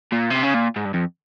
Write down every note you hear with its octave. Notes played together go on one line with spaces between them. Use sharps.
A#2
C3
C#3
A#2
G#2
G2
F2